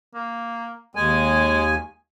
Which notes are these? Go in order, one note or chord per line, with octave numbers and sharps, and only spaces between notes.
A#3
D#2 G#3 G#5